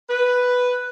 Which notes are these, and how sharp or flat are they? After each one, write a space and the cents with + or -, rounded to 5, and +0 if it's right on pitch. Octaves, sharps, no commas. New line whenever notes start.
B4 +0